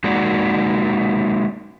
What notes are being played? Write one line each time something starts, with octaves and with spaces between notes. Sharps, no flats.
G#3 A#3 D#4 F#4 D5 F#5